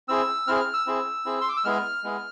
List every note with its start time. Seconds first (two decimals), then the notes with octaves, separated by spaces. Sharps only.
0.08 C4 E4 G#4 E6
0.47 C4 E4 G#4 F6
0.60 F6
0.74 E6
0.87 C4 E4 G#4
1.25 C4 E4 G#4
1.41 C6
1.49 D6
1.57 E6
1.64 G#3 B3 E4 G#4 F6
2.03 G#3 B3 E4 G#4